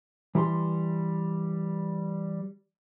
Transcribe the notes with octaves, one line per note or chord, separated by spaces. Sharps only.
E3 G3 A#5 C6